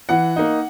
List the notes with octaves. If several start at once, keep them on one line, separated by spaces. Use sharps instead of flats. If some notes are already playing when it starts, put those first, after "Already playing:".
E3 F#5
A#3 D#4